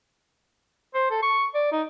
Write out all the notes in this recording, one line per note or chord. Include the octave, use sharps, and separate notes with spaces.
C5
A4
C#6
D5
D#4